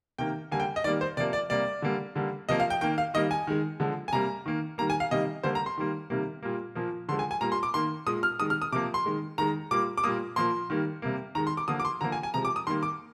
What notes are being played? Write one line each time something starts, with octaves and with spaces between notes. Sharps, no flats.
C3 D#3 A#3 G5
D3 G3 A#3 G#5
G5
D#5
D#3 G3 A#3 D5
C5
C3 F3 A#3 D5
D5
C3 G3 A#3 D5
D3 G3 A#3
D3 G3 A#3
C3 F3 A#3 D#5
F5
G5
D#3 A#3 G5
F5
D#3 G3 A#3 D#5
G#5
D#3 G#3
D3 F3 G#3
G#5
C3 G3 A#3 A#5
D#3 A#3
D#3 G3 A#3 A#5
G#5
F5
C3 D#3 G3 A#3 D#5
D3 G3 A#3 C5
A#5
C6
D#3 G3 A#3
C3 D#3 G3 A#3
A#2 G3 A#3
A#2 F3 A#3
D3 F3 G#3 C6
G#5
G#5
A#2 G3 A#3 A#5
C6
D6
D#3 A#3 C6
A#2 G#3 D#6
F6
D#3 G#3 D#6
F6
D#6
C3 F3 A#3 D6
C6
D#3 G#3
D#3 G#3 A#5
A#2 G3 A#3 D6
D6
A#2 G3 A#3 D#6
A#2 F3 A#3 C6
D#3 G3 A#3
C3 G3 A#3
D#3 G#3 A#5
C6
D6
D3 F3 A#3 D#6
D6
C6
D3 F3 A#3 A#5
G#5
G#5
C3 F3 G#3 A#5
D6
D#6
D#3 G3 A#3 C6
D6